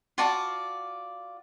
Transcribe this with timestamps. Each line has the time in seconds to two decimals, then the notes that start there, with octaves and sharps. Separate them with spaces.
0.18 F4 F#4 D5 A5